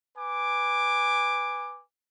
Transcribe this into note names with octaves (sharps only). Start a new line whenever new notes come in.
B4 G#5 D6